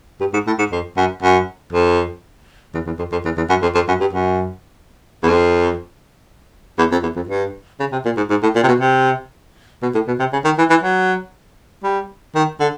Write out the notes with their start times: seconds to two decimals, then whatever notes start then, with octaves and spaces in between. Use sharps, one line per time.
0.20 G2
0.33 G#2
0.47 A2
0.59 G#2
0.72 F2
0.97 F#2
1.22 F#2
1.72 F2
2.74 E2
2.86 E2
2.99 F2
3.12 F2
3.25 E2
3.37 E2
3.49 F#2
3.62 F2
3.75 F2
3.88 F#2
4.00 G2
4.13 F#2
5.23 E2
5.26 F2
6.79 E2
6.92 F2
7.03 E2
7.16 F2
7.29 G2
7.80 C#3
7.92 C3
8.05 A#2
8.17 G#2
8.30 G#2
8.43 A2
8.55 A#2
8.63 C3
8.68 B2
8.80 C3
9.82 B2
9.95 A2
10.07 B2
10.19 C3
10.33 C#3
10.45 D#3
10.58 E3
10.70 E3
10.83 F#3
11.84 G3
12.35 D#3
12.60 D3